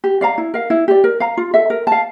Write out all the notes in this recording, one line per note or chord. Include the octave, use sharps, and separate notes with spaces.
G4
D5 F5 A#5
E4
A#4 F5
E4
G4 D5
A#4
F5 A#5
F4
A4 E5
A#4
F5 A5